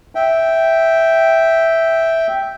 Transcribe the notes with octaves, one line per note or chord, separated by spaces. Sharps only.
E5 G5